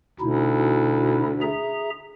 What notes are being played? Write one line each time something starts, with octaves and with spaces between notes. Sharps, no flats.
D2 B2 D#4 E4
G#4 E5 A#5